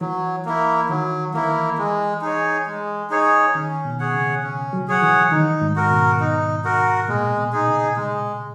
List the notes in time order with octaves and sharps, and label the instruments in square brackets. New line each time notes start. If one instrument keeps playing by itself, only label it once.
[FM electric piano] E3 [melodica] F#3
[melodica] A#3 E4
[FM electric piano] D#3 [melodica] F#3
[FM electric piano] E3 [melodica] A#3 E4
[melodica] G#3
D#4 G#4 C#5
G#3
D#4 G#4 C#5
[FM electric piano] D#3 [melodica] C#4
[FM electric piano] B2
[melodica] G#4 C#5 F#5
[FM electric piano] C#3
[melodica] C#4
[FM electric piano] F#3
[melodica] G#4 C#5 F#5
[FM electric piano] E3
[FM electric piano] D#3 [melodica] D#4
[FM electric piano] G#2
[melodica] F#4 A#4
[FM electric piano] B2
[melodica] D#4
F#4 A#4
[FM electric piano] A#2 [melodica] G#3
[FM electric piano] B2
A#2
B2
[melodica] D#4 G#4
[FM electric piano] C#3
[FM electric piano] C#3 [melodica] G#3